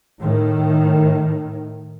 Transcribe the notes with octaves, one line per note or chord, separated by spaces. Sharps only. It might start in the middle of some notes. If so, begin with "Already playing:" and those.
A2 D#3